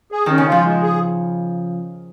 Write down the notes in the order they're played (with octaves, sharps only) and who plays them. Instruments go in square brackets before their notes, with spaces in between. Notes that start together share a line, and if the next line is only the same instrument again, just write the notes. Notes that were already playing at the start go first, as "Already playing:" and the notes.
[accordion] G#4
[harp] D#3 [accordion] C#4
[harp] C#3
[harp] F3 [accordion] F4
[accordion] G#3
G#4